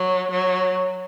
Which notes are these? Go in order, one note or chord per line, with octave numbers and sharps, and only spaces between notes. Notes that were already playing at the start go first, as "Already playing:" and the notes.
Already playing: F#3
F#3